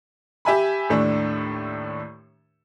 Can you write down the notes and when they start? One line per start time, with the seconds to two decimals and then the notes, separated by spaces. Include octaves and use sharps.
0.45 G4 E5 G#5 B5
0.89 D#2 A2 A3 D4